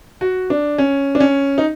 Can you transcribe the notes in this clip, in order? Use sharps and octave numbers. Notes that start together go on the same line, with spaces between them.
F#4
D4
C#4
D4
C#4
D#4